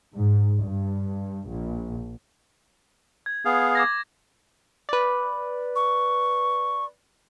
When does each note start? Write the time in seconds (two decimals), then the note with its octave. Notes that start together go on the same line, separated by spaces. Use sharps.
0.14 G#2
0.62 G2
1.48 A#1
3.26 G#6
3.45 B3 G#4 F5
3.75 D6 G#6 A#6
4.89 B4 D5
5.76 C#6